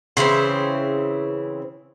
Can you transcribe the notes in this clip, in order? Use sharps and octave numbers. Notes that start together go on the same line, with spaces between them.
C#3 E3 C4 C5